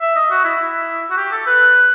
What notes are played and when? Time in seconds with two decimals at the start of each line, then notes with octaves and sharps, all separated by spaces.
0.01 E5
0.16 D#5
0.31 F#4
0.44 E4
0.60 E4
1.11 F#4
1.17 G4
1.32 A4
1.47 B4